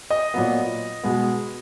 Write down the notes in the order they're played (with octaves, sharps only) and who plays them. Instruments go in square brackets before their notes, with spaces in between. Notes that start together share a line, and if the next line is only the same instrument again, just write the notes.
[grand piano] D#5
A#2 F#3 B3
B2 G#3 B3